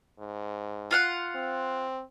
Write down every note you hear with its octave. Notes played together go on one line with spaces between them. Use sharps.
G#2
F4 F5 F#5
C4